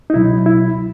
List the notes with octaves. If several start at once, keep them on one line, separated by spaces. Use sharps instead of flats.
D#4
C#2 B2 F#3 E4
E4